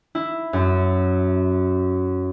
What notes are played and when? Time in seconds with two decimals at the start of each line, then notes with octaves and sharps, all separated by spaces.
0.15 E4
0.53 F#2